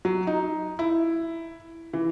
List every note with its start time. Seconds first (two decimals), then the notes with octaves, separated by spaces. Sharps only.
0.05 F#3
0.27 D#4
0.79 E4
1.93 E3